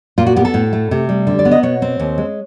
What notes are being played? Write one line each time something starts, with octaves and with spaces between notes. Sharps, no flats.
A#2 F4
F#4
B3 G4
A4
A2
A3
C3
G3
D3
D5
B3
D#5
B2 C#5
C4
D#2
G#3